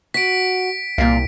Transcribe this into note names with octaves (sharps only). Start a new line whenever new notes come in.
F#4 B6 D7
C2 A#2 F5